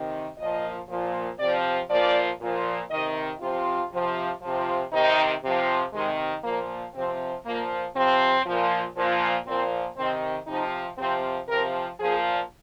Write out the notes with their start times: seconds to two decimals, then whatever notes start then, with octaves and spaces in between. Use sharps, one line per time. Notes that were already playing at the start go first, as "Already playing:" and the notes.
Already playing: C3 D#3
0.38 A#2 F3 D#5
0.90 A#2 F3
1.39 C3 F3 D5
1.90 A#2 F3 D5
2.41 A#2 F3
2.91 C3 D#3 D#5
3.41 C3 F3 F4
3.91 C3 F3
4.43 C3 F3
4.92 C3 D#3 D#4
5.44 C3 F3
5.94 C3 D#3 G#3
6.44 A#2 F3 A#3
6.95 C3 F3 C4
7.46 A#2 F3 A#3
7.95 C3 F3 C4
8.46 A#2 F3
8.97 A#2 F3
9.46 A#2 F3 C4
9.97 C3 D#3 C4
10.47 C3 F3 D#4
10.98 C3 F3 C4
11.48 C3 F3 A#4
12.00 A#2 F3 G#4